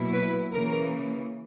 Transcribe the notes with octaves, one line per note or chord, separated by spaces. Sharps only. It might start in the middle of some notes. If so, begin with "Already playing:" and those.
Already playing: B2 F#3 A#3 E4
B4
C#3 E3 A#3 A#4